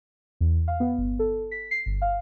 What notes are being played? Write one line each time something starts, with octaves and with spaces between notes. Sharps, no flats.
E2
F5
B3
G1
A4
B6
C7
G1
F5